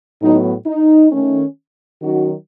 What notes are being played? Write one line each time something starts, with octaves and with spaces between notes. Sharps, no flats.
A2 F#3 B3 D#4
D#4
D#3 A3 C#4
D#3 F#3 C#4 D#4 F#4